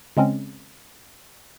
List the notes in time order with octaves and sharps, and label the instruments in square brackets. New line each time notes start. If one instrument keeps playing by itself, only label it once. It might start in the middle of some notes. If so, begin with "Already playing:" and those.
[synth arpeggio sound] C#3 G#3 C4 C#4